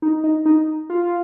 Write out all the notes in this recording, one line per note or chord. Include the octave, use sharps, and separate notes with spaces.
D#4
D#4
D#4
F4